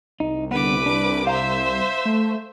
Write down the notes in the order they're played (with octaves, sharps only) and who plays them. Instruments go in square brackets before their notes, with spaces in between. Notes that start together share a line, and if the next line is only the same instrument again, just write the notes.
[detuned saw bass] C2 [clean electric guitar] D#4
[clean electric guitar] D3 B3 [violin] B4 D6
[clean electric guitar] D4
[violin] C5 E5 [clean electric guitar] F5 A#5
[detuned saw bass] A3